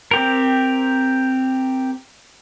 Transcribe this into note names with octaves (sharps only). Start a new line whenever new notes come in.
C4 G4 A#4